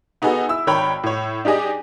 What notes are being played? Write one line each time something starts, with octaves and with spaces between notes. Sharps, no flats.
B3 D#4 F#4 G#4 A4
E4 E6
G#1 D#3 C#5 G5 A#5 B5
A2 C#5
D4 D#4 G4 G#4 D#5